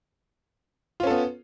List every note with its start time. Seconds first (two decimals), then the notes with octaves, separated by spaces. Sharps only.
1.00 F4
1.03 C#4
1.07 A4
1.10 B3